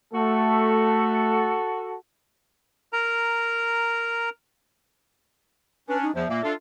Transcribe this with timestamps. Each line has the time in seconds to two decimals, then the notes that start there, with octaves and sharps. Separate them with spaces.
0.14 A3 F#4 A4
2.93 A#4 A#5
5.88 C#4 D4 B4
6.03 D#4
6.15 E2 F3 E5
6.29 A#2 A#3
6.43 D4 F4 A4